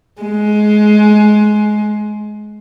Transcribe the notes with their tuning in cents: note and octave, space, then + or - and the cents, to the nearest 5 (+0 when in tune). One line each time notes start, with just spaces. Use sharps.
G#3 +20